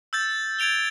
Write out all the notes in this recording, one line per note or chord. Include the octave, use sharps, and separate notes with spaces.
E6 G6 A6
G#6 A6 D7 F7 G7